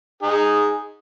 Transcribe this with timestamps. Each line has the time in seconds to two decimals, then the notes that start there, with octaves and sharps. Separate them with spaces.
0.23 D#4 G#4